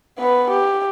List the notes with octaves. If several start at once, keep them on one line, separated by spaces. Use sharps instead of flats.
B3 B4
G4